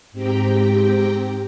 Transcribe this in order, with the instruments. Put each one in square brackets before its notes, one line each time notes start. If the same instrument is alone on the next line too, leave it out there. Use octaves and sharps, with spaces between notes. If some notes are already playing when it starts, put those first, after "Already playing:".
[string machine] G#2 C4 G4 G5 A#5